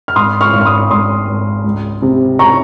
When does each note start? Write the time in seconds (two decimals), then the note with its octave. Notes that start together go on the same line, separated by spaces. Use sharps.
0.08 F6
0.16 G#1 C6 D#6
0.41 C#6 F6
0.53 G#1
0.61 F6
0.65 C6 D#6
0.90 G#1 C6 D#6
1.27 G#1
1.64 C#2
2.02 C3
2.39 A#5 C#6